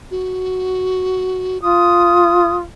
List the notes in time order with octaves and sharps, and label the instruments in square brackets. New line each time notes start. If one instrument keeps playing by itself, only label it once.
[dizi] F#4
[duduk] F4 [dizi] D#6